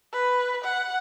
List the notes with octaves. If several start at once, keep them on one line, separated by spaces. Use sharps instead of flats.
B4
F#5